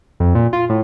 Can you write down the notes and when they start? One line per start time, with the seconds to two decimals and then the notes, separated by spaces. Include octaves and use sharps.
0.20 F2
0.35 A#2
0.53 F4
0.69 A2